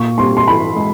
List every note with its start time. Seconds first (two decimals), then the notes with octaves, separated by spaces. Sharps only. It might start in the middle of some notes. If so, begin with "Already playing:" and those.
Already playing: A#2 C#6
0.18 G3 C4 C6
0.37 C6
0.47 E3 B5
0.76 G#3